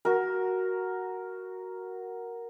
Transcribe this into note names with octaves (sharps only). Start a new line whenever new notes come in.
F#4 A#4